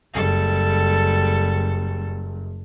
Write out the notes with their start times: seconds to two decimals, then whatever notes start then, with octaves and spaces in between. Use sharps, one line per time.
0.14 F#1 G3 A4